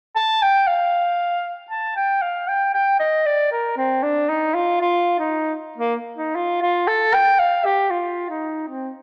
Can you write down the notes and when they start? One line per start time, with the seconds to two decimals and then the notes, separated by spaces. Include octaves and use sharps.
0.16 A5
0.42 G5
0.68 F5
1.71 A5
1.96 G5
2.22 F5
2.48 G5
2.74 G5
3.00 D#5
3.26 D5
3.52 A#4
3.77 C4
4.03 D4
4.29 D#4
4.55 F4
4.81 F4
5.19 D#4
5.78 A#3
6.17 D#4
6.35 F4
6.62 F4
6.88 A4
7.14 G5
7.39 F5
7.65 G4
7.91 F4
8.30 D#4
8.69 C4